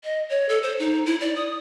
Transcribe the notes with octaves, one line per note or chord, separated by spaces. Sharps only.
D#5
C#5
A4
C5
D#4
E4
D5
D#6